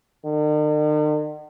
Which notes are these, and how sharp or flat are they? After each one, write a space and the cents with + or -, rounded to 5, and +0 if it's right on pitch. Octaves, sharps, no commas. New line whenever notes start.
D#3 -45